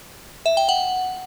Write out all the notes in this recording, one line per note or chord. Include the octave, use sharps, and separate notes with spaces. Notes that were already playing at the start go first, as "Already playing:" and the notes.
E5
G5
F#5